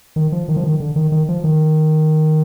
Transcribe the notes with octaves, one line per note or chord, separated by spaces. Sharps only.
D#3
F3
D#3
F3
D#3
D3
D#3
D#3
F3
D#3